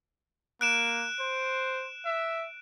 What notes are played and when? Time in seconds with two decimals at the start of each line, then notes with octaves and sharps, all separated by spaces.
0.61 A#3 F#6 D7 E7
1.20 C5
2.05 E5